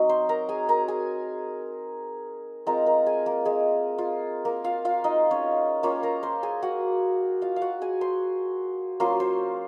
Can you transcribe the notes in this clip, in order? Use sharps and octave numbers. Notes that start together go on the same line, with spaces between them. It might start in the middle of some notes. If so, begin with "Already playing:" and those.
Already playing: F#3 C4 D#4
C5 C6
A#4 A#5
G#4 G#5
A#4 A#5
G#4 G#5
G#3 C4 F4 A#4 A#5
A#4 A#5
G#4 G#5
A#3 A#4
G#3 G#4
F4
A#3 A#4
F4 F5
F4 F5
D#4 D#5
C#4 C#5
A#3 C#4 F4 C#5
A#4 A#5
C5 C6
G#4 G#5
F#4 F#5
F4 F5
F5
F#4 F#5
G#4 G#5
C5 C6
F#3 A#3 C#4 F4 C5 C6
C5 C6